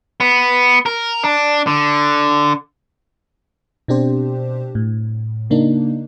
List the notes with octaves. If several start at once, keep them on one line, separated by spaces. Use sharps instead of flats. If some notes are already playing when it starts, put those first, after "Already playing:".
B3
A#4
D4
D3
B2 C4 D4 G4 C5
A2
C#3 A#3 D4 D#4